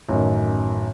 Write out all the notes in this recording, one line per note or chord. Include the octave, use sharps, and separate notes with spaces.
A1 F#2 D#3